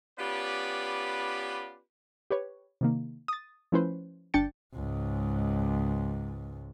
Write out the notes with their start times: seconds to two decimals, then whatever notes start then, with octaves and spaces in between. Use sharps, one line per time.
0.18 B3 C#4 F4 G4 B4 D5
2.31 G4 B4 C#5
2.81 C3 D#3 A#3
3.28 D#6 A6
3.72 F3 A3 C#4 E4 B4 C5
4.34 G1 D4 G5 A6 C#7
4.74 C#2 G#2